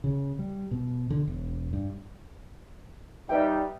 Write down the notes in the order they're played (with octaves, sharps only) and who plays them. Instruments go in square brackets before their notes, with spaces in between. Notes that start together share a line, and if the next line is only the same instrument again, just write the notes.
[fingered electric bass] C#3
G3
B2
D3
E1
G2
[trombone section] G3 D#4 [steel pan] B4 E5 G5